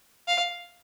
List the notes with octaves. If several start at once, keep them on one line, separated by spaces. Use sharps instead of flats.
F5